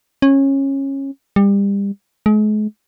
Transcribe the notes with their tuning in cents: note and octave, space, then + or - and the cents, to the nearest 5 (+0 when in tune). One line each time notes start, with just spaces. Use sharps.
C#4 -20
G3 +30
G#3 +40